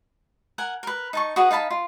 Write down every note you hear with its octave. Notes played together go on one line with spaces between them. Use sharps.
A#4 F#5 G#5
A#4 B4
D#4 A5 C#6
F#4 G#4 B4 D#5
D#4 F5 A5 B5
F4